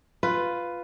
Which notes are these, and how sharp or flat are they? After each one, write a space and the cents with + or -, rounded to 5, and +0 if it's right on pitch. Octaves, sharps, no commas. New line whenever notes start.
F4 +0 B4 +10